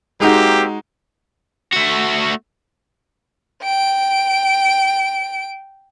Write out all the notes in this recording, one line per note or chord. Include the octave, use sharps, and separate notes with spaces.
G#3 A#3 C4 D#4 F#4 G4
A3 F#4
G5 D7